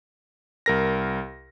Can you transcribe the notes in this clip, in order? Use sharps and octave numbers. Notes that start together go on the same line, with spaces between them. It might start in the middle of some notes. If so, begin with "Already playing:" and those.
C2 A#4 A#6